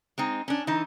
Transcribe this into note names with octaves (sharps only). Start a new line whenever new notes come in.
G#3 C4 D#4
C#4 D4
E3 D#4